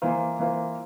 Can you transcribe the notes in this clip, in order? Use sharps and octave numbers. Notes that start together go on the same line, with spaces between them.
E3 A#3 F4 C5
E3 A#3 F4 C5